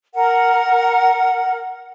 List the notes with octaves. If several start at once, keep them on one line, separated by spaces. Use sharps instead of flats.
A#4 F#5